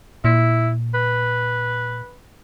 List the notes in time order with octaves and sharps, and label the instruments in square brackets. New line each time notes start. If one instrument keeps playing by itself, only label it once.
[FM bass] A#2 [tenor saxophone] E4
[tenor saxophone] B4